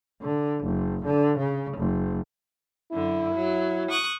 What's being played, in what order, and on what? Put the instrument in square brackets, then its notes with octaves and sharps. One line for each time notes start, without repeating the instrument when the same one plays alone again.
[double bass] D3
F#1
D3
C#3
F#1
[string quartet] F#2 D3 [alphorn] E4
[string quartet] F#3
C#6 D#6 F#6